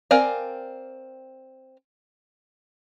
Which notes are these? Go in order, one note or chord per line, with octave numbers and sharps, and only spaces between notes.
C4 A#4 D5 F5 G#5